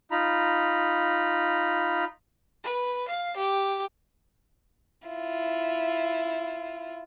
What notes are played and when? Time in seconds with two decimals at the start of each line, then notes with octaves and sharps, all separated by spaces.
0.11 D#4 F4 A#5 B5
2.64 B4
3.08 F5
3.36 G4
5.05 E4 F4